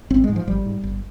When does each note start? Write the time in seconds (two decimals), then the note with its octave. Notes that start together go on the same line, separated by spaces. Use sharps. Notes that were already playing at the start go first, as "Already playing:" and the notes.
0.10 G#1 C4
0.24 G#3
0.29 G#2
0.36 F3
0.47 G#1 G3
0.66 G#2
0.84 G1